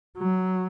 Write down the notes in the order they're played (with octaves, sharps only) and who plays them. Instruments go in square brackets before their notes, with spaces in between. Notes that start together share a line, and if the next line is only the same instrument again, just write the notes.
[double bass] F#3